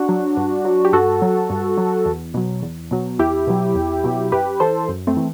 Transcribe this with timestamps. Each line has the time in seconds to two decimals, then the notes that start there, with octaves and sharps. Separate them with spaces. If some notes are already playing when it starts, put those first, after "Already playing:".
Already playing: D4 F#4
0.09 F#3
0.37 G2
0.65 F#3
0.85 G4
0.93 G2 F#4 A4
1.22 F#3
1.50 G2
1.77 F#3
2.06 E2
2.34 B2 F#3
2.63 E2
2.91 B2 F#3
3.19 E2 E4 G4
3.47 B2 F#3
3.75 E2
4.04 B2 F#3
4.32 F#2 G4 B4
4.60 E3 A4 C5
4.88 F#2
5.07 A3 C4
5.17 E3